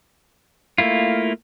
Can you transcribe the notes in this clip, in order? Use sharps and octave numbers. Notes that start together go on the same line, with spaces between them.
A3 A#3 E4 F4